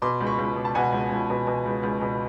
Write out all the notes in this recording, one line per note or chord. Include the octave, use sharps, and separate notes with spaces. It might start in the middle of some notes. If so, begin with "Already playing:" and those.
B2 C6 D6
C#2
B5 C#6
C#2
B2
A5
B2 F#5 G#5
C#2
C#2
B2
B2
C#2
C#2
B2